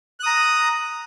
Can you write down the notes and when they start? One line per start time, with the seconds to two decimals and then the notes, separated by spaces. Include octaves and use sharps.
0.20 F#6
0.23 D#6
0.26 A#5